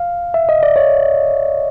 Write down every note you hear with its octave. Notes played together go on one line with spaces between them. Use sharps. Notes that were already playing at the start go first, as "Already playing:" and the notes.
Already playing: F5
E5
D#5
D5
C#5